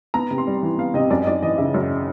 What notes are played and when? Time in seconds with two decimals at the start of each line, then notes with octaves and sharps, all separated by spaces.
0.14 B3 A#5
0.31 C3
0.38 C6
0.47 G3
0.63 E3
0.78 B3 F5
0.94 C3 D#5
1.10 F#2 D5
1.22 D#5
1.27 F#2 D5
1.42 E3 D#5
1.58 C#3 E5
1.74 F#2